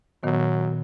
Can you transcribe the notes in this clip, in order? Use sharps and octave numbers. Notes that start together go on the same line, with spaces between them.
A#2 D#3 F#3 B3